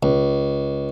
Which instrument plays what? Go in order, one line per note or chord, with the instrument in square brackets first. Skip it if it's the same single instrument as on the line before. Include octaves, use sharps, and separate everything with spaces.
[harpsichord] C#2